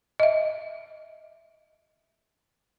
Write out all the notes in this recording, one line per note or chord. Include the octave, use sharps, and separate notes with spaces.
D#5 E5